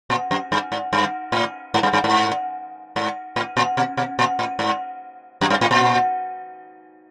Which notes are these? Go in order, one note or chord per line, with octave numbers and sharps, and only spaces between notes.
A#2
F#2
G2
G#2
G2
A2
G#2
G2
G2
G#2
G#2
A2
A#2
B2
B2
A#2
A2
G#2
F#2
G2
A2
A#2